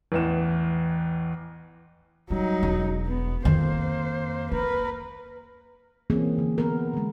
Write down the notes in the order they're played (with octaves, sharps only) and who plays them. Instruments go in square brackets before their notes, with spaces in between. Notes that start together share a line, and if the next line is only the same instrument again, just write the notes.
[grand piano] A1 E2 E7
[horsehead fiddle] F#3 D#4 [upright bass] G3
[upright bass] E1
[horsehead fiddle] B3
[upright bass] F2 D#3 [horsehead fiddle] A#3 C5
[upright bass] A#3 [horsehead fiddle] A#4 B4
[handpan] E3 A#3 C4 C#4 G#4
D3
B3 A#4
D3 G#3